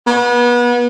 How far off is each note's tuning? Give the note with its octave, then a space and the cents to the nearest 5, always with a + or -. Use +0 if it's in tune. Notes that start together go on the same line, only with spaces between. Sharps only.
B3 -30